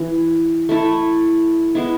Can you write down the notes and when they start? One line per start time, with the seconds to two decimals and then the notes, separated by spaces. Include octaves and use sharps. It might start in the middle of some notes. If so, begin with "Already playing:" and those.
Already playing: E3
0.69 A3 E4 A4
1.75 G#3 B3 E4